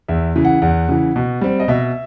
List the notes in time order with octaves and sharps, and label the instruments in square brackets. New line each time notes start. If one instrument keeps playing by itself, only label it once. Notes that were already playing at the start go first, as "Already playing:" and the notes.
[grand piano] E2 E5
C#3 E3
F#5
E2 F#5
C#3 E3
B2
G3 C4
D#5
B2 E5